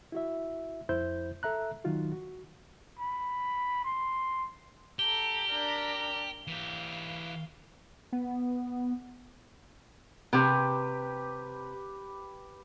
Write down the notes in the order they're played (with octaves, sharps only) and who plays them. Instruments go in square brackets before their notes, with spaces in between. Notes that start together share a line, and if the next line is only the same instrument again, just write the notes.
[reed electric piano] E4 F#4 E5
F2 E4 C5 G6
A4 E5 A#5 F#6
D#3 F#3 D#4 F4 F#4
F#4
[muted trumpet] B5
C6
[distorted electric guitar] G4 [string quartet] A4 A#5 [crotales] G7
[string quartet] D4 A#4 A#5
[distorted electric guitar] E3 G4 [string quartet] F5
[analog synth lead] B3
[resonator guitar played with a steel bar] C3 [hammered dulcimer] G4 B4